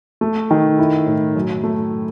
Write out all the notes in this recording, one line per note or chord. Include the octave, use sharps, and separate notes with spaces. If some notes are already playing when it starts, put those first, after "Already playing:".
A3
D#3
E4
A2
F#2
A3